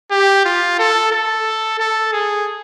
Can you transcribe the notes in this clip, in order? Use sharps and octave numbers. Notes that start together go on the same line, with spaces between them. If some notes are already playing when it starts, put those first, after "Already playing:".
G4
F4
A4
A4
A4
G#4